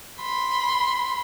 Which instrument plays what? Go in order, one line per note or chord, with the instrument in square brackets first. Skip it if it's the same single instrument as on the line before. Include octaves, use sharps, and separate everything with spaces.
[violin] B5 C6